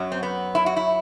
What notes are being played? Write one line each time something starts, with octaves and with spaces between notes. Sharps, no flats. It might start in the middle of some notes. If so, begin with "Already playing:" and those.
Already playing: F#2 F#3
C4
B3
E4
F#4
E4